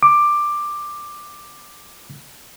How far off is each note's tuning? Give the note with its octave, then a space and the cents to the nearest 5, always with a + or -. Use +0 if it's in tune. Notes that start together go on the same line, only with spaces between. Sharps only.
D6 +10